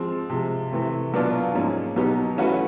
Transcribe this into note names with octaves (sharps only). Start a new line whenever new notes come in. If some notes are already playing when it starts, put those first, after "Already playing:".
Already playing: F3 G#3 C4
C3 F3 G#3
C3 E3 A3 C4
B2 F#3 B3 D4 F4
G#2 F3 A#3 C#4
B2 F#3 B3 D#4 G4
E3 A3 C#4 F#4 B4